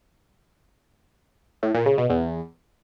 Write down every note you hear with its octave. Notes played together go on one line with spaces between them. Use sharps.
A2
A#2
C#3
B2
E2